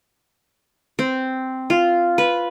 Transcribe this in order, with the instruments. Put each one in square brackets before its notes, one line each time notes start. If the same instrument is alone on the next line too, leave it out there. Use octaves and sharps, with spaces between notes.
[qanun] C4
F4
B4